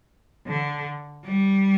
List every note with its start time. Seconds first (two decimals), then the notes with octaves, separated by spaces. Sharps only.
0.47 D3
1.25 G3